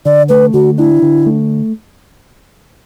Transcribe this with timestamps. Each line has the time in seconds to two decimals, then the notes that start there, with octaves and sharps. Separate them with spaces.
0.05 D3 D5
0.29 A3 B4
0.53 D3 F#4
0.78 D4 E4
1.02 D3
1.26 A3